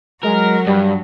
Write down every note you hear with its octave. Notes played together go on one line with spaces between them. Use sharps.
F#3 G#3 A#4
G2 G3